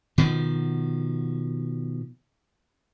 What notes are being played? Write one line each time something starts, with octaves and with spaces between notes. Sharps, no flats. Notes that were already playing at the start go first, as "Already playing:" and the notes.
B2 D#3 F3